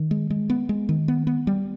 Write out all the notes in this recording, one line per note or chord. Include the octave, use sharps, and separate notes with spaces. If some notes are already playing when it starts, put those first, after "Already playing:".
Already playing: D#3
G#3
G#3
B3
G#3
D#3
B3
B3
G3